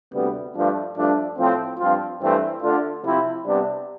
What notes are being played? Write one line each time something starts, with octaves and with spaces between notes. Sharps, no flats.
D2 C3 G3 B3
G2 F3 A3 D4
G2 F3 A3 D4
A2 F3 C4
G2 F3 C4 F4
G2 E3 A3 C4
D3 A3 D4 F4
C3 F3 C4 E4
C3 G3 B3 D4